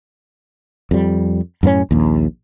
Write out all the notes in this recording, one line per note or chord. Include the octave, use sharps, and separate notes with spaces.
F2 G3
F#2 A2 A#3 C#4
A#1 D#2